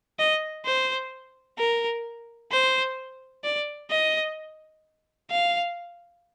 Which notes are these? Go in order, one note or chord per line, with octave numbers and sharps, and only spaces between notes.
D#5
C5
A#4
C5
D5
D#5
F5